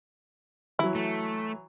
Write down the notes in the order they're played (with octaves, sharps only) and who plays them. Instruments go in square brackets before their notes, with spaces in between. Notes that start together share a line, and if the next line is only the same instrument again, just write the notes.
[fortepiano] E3 F#3 [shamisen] E4
[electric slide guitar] A3